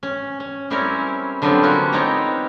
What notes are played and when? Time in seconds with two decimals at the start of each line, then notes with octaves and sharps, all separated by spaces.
0.03 C#4
0.40 C#4
0.70 G3 C4 C#4 E4 A#4 C#5
1.42 D3 F#3 G3 B3 C4 F4
1.63 A#3 C#4 F4 F#4 B4
1.92 B3 C4 D#4 C#5 G5 A#5